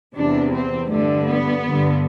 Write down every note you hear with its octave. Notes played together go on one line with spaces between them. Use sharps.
E2 C3 E3 D4
C4
G2 D3 A3
B3
G2 D3